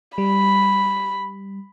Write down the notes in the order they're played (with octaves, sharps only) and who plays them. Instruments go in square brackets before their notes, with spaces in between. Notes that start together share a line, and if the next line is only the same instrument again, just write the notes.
[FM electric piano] G3 [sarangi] B5